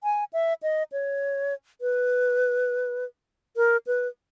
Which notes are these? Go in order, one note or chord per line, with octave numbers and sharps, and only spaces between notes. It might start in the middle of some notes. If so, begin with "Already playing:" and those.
G#5
E5
D#5
C#5
B4
A#4
B4